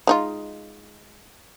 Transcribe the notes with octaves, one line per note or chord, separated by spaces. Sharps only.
G#3 D#4 F4